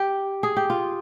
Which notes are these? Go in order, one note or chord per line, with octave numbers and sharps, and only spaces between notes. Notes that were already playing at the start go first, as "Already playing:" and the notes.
Already playing: G4
G#4
G4
F4